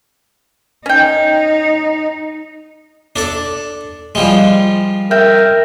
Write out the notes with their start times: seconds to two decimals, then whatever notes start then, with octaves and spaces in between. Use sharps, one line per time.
0.86 C#4 D#4 G5
3.16 D4 A4 D5
4.15 F3 G3 G#3
5.11 A#4 E5 G5